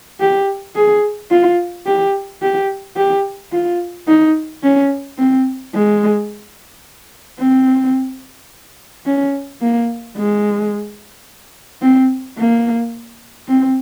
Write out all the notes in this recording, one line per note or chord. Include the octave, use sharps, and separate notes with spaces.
G4
G#4
F4
G4
G4
G4
F4
D#4
C#4
C4
G#3
C4
C#4
A#3
G#3
C4
A#3
C4